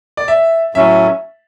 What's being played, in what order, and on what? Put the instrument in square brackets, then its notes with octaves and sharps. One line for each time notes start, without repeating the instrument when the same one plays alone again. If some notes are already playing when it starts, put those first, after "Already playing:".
[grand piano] D5
E5
[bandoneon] A2 F#3 C#4 [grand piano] E5